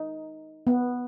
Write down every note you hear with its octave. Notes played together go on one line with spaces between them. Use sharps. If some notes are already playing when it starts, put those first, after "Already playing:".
Already playing: D#4
B3